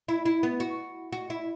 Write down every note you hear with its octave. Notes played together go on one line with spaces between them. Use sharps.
E4
E4
B3
F#4
F#4
E4